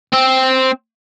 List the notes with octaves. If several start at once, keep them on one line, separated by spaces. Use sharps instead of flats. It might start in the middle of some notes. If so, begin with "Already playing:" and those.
C4